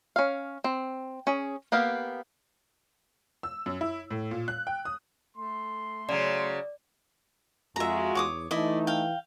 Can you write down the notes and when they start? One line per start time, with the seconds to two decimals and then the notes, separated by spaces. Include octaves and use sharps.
0.16 C#4 F5
0.64 C4
1.27 C#4 G#4
1.72 A#3 B3 G4 F5
3.43 E6
3.66 F#2
3.81 E4
4.11 A2
4.31 A#2
4.48 F#6
4.67 G5
4.85 D#6
5.37 A3 C6
6.09 C#3 F#3 D5
7.76 F2 G#3 F4 F#4 E5 A#5
8.15 E2 C#5 D6 D#6
8.51 E3 A3 D#4 E4 D5 D#5
8.87 F5 G5